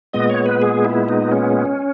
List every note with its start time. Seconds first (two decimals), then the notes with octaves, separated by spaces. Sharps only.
0.13 A#2 G#3 B3 D#5
0.30 C#5
0.46 B4
0.62 G#4
0.85 E4
1.09 D#4
1.32 C#4